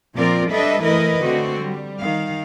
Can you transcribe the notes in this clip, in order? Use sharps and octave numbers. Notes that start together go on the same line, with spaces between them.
A#2 F3 C4 F4 A#4 D5
G3 D4 A4 B4 D#5 E5
E3 A3 E4 A#4 B4 D#5
D3 A3 C4 F#4
G3
D#3 F5